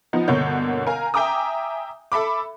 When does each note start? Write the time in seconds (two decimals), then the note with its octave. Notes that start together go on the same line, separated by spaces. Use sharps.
0.13 F3 B3 D#4
0.28 G1 B2 D3 A#3 C#5 G6
0.87 A#4 F5 G#5 A#5
1.14 E5 G5 G#5 A#5 D6 D#6
2.12 A4 E5 B5 D6